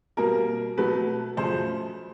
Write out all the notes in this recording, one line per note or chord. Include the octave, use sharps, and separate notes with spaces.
B2 G3 A#3 A#4
B2 F#3 A3 B4
F#2 C#3 F3 A3 C5